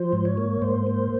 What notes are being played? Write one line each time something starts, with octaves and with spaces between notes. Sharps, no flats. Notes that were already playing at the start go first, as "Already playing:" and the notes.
Already playing: F3 C5
G#2
C#5
A#3
G#2 C5
A#3